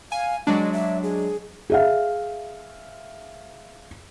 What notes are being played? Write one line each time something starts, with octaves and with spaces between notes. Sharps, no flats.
F5 G#5
F#3 G#3 D4 D#5
E5
G#4
G#4 E5 F5